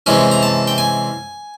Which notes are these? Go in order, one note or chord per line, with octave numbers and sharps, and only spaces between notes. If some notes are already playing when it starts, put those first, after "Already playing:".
C3 E3 G#3 C#4 G#5
A#5
A5
G5
G#5